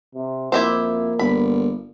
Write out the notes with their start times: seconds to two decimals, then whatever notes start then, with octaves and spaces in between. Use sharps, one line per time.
0.15 C3
0.52 F2 A#3 E4 G4 C5
1.19 G1 B5